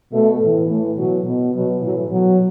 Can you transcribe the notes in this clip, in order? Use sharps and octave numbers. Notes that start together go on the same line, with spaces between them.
B2 A3
A2 E3
A2 E3 A3
B2 F#3
B2
B2 F#3
A2 E3 F#3
B2 F#3